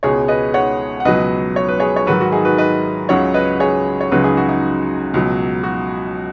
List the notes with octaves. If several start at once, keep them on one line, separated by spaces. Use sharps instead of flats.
C#2 B2 G#3 G#4 C#5
B4 D#5
C#5 F#5
F#5
C#2 B2 F#3 B4 D#5
C#5
B4
G#4 C#5
C#5
G#2 D#3 F#3 F#4 B4
F#4
D#4 G#4
F#4 B4
B4 D#5
C#2 C#3 F#3 C#5 F#5
B4 D#5
G#4 C#5
C#5
C#2 C#3 F#3 F#4 B4
D#4 G#4
F#4
D#4
C#2 B2 F#3
F#4